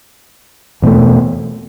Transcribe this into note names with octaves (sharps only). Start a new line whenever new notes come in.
E2 B2 A3